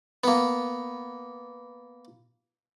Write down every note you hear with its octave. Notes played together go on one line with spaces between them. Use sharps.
A#3 B3